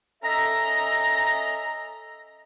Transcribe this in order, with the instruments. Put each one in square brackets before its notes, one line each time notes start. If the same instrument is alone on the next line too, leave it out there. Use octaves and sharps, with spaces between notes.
[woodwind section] C#4 A4 D#5 E5 A#5